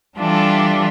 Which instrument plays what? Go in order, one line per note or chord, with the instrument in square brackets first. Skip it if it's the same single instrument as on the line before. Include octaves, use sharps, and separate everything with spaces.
[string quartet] E3 G3 D4 F4 A4